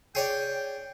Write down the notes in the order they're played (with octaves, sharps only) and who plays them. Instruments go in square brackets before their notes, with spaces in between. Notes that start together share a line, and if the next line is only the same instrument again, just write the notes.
[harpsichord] G#4 C#5 D5 [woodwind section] G5